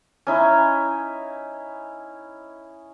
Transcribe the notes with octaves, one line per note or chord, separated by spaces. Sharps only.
C#4 D#4 E4